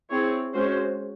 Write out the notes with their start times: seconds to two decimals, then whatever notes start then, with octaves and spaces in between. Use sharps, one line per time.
0.11 C4 E4 G#4 C#5
0.54 G#3 C#4 F#4 C5